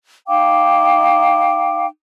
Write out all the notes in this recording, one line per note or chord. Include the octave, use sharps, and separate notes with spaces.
D#4 F5 G5 D6